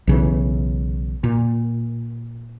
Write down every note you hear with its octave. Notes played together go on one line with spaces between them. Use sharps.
B1 C#3 E3
A#2